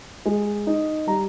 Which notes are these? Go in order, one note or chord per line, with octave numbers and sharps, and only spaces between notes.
G#3
D#4
G3 A#5